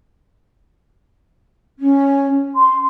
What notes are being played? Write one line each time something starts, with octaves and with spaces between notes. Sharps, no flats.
C#4
C6